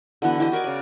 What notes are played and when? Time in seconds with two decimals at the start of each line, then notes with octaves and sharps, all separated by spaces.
0.22 D3 E3 B3 F#4
0.39 E3 E4 G4 D#5
0.52 F#4 A#4 D5 G#5
0.64 C#3 D5